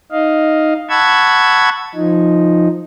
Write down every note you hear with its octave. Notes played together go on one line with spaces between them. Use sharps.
D#4 D#5 F5
F#5 A5 B5 C#6 E6 G#6
F3 D#4